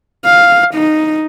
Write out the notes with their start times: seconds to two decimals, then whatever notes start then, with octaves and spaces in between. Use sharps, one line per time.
0.25 F5
0.74 D#4